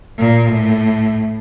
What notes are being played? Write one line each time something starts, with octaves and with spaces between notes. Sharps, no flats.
A#2
A2